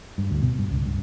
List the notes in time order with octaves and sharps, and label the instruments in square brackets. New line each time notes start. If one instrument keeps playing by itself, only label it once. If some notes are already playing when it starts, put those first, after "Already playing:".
[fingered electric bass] G2
D2
B2
G2
C#2
G2